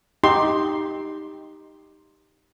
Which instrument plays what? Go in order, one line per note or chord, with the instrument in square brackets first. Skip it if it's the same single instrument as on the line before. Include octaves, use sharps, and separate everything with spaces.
[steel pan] D#4 G4 C6